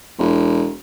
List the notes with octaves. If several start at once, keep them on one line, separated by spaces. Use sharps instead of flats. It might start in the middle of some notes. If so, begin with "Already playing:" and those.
E1